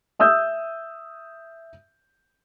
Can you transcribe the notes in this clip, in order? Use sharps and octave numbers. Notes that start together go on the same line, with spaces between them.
E5 D#6 E6 G6